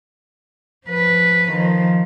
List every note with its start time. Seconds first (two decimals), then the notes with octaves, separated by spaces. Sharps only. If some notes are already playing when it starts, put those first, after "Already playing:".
0.86 F3 B4
1.52 D#3 F3